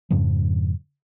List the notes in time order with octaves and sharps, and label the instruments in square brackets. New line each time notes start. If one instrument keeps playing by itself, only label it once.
[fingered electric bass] F2 G#2 C#3 F3